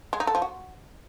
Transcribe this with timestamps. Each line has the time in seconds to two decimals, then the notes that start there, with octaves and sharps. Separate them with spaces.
0.13 G#3
0.20 D#4
0.27 A4
0.35 F3
0.42 F#4